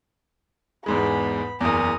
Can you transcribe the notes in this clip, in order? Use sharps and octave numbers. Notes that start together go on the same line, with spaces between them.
E2 G#2 G#3 B3 B5
F#1 E2 A#5 D#6